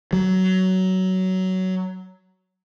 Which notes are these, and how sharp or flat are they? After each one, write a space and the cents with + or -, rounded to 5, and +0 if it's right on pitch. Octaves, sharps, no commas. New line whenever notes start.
F#3 +15